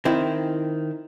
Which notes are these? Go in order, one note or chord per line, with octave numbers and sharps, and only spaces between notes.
D#3 C4 E4